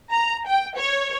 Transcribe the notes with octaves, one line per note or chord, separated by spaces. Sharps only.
A#5
G5
C#5